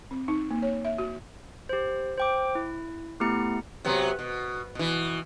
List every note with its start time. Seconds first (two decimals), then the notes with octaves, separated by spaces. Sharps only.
0.11 C4
0.28 D#4
0.51 A#3
0.62 C#5
0.85 E5
0.98 F#4
1.69 G4 C5
2.18 C5 G5 D6
2.55 E4
3.20 A3 B3 E4 G4 A#5 C#7
3.85 C3 F#3 B3
4.19 B2
4.75 B2 E3